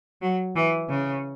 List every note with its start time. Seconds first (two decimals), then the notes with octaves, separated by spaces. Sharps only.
0.22 F#3
0.56 E3
0.90 C#3